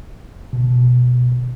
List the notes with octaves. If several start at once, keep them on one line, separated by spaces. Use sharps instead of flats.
B2